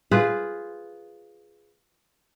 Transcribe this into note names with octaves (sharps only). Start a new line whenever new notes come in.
F4 G#4 B4 C5